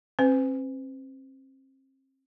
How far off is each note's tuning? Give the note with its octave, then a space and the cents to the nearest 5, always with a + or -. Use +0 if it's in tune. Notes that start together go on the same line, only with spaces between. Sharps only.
C4 +40 B4 +45